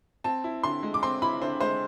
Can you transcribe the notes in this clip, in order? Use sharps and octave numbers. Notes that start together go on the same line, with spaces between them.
C4 A5
E4
D3 C6
G#3
D6
C4 C6
E4 B5
D3 C5
G#3 C5